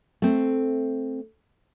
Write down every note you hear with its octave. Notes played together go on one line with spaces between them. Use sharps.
A3 C4